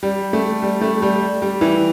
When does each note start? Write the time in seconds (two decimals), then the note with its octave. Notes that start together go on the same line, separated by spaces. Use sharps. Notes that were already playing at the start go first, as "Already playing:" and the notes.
0.03 G3
0.33 A3
0.63 G3
0.81 A3
1.02 G3
1.42 G3
1.61 E3